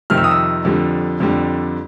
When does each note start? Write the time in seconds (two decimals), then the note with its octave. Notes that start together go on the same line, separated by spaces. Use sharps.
0.10 F2 C3 D#3 G3 F6
0.17 E6
0.24 D#6
0.31 E6
0.65 F2 D3 G3
1.20 F2 D3 G3